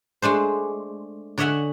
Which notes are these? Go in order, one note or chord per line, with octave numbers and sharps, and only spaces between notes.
G#3 A3 D4 C5
D3 C#5 D#5 E5 F#5 G#5